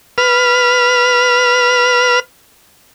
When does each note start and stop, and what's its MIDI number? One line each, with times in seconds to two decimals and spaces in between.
0.18 2.20 71
0.18 2.20 89